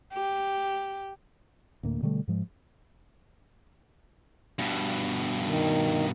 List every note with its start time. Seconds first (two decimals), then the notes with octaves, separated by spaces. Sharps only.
0.13 G4
1.83 D2 A2 A#3
2.02 B2 D3 G3 A3
2.28 G#2 F3 G#3
4.59 G2 B2
5.43 D#3